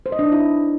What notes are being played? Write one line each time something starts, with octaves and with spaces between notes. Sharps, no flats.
C5
D#5
D4
D#4
E4